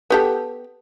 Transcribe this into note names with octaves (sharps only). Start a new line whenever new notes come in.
B3 G4 A4